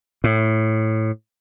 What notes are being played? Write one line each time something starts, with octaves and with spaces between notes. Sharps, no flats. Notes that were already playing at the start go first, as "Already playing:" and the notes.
A2